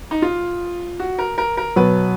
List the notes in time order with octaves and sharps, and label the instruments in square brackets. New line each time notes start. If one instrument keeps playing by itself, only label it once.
[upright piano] D#4
F4
F#4
A#4
A#4
A#4
[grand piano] B2 F#3 B3 [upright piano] B4